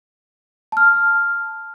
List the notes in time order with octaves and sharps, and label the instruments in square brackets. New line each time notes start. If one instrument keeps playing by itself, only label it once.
[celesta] A5 F6